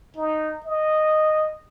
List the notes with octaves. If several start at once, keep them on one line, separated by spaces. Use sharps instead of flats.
D#4
D#5